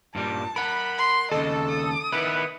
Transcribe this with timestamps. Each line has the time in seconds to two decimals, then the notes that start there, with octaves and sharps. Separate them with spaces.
0.15 G2 A#2 G3 A5
0.56 A#4 F#5 B5
0.98 C6
1.31 D#2 C#3 A4 D#5
1.68 D#6
2.13 D#3 B3 E4 B4